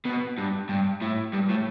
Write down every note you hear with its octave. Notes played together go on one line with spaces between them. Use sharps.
B2
G2
G2
A2
G2
A2